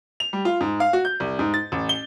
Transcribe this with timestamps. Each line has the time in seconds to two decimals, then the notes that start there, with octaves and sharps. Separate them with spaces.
0.20 F7
0.33 G3
0.45 F4
0.61 G#2
0.80 F5
0.93 F#4
1.05 G6
1.20 C2
1.39 G#2
1.54 A6
1.72 A1
1.89 G7